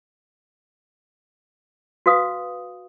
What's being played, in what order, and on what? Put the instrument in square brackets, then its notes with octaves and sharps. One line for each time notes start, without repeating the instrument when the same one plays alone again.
[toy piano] F#4 B4 F5 D#6